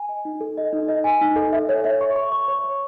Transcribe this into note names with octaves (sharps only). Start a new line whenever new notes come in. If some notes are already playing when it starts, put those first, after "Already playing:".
Already playing: G#5
D#5
D#4
A4
D#5
D#4
D#5
G#5
D#4
A4
E5
C#5
E5
C#6
C#6
C#6
C#5
C#5